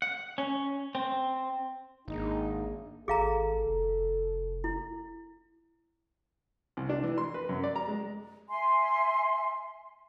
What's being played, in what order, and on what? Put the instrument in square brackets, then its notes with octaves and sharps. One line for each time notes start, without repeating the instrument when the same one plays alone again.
[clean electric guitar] F#5
C#4
C4
[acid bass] G#1 [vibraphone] A#3 D4 G#4 [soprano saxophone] D#4
[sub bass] G#1 [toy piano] G#4 F5 A#5 [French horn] A4
[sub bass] F1
[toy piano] E4
[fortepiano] C2
D4
E3
C6
B4
F#2
D5
A#5
G#3
[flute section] E5 G#5 C6